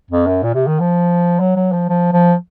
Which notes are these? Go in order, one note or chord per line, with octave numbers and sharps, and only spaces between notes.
F2
F#2
A#2
C3
D#3
F3
F#3
F#3
F3
F3
F3